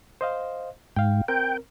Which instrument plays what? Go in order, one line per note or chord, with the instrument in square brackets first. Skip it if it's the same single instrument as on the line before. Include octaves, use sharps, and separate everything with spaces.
[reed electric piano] C5 D#5 F5
[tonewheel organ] G#2 [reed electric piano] F5 G5
[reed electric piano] C4 A#4 [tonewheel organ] G5